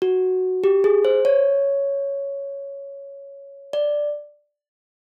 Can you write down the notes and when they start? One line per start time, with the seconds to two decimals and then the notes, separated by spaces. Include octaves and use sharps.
0.02 F#4
0.64 G4
0.84 G#4
1.05 C5
1.25 C#5
3.73 D5